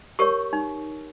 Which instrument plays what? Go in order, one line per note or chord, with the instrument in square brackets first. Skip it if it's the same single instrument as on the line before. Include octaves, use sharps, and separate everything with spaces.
[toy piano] G4 A#4 C#5 C#6
D#4